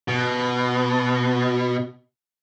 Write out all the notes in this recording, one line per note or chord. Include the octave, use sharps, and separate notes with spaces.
B2